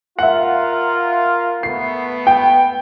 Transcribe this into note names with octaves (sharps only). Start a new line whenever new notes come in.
F4 A#4 E5 F#5
A3 B3 C7
G5